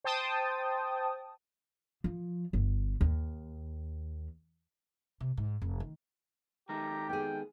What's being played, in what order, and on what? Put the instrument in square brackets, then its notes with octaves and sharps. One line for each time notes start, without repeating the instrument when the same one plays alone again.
[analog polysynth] C5 G5 A5 D#6
[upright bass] F3
G1
D#2
C3
G#2
F1
D#3
[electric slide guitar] D#3 G#3 A3 [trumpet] G4 [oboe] A#5
[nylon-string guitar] B3 G#4 [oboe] G5